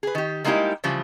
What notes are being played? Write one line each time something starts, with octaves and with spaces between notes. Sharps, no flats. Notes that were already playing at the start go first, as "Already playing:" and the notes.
G#4 B4
D#3 G4
G3 G#3 A#3 D#4 E4 G4
C#3 E3 F3 G3